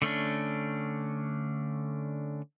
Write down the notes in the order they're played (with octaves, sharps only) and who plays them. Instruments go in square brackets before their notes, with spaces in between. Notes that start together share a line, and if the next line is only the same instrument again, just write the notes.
[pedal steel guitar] D3 A3 C#4 D4